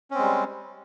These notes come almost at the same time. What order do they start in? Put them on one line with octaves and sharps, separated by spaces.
C#4 C4 G#3 G3